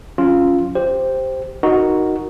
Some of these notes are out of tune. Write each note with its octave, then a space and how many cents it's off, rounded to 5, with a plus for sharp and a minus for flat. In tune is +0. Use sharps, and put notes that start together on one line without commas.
F#3 -35 C#4 +0 F4 +0
G4 +0 C5 +0
D#4 +0 F#4 +0 A#4 +0